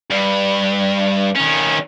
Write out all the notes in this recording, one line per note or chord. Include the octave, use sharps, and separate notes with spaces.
G2
D#3 C#4